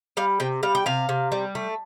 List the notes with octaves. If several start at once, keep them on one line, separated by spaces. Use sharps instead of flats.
G3 F5
C3 G5
G3 F5
G5
C3 F5
C3
G3
A3